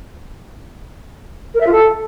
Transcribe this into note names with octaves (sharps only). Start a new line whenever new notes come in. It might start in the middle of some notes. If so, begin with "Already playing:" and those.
A#4
E5
F4
A4